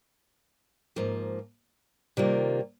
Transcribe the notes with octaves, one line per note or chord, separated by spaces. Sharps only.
G#2 F3 A#3
C3 D#3 G3 A#3 F4